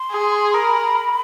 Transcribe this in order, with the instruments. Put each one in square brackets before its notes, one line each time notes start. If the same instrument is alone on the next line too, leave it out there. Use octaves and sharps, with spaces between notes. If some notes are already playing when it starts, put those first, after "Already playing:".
Already playing: [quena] C6
[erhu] G#4
[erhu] A#4 [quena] B5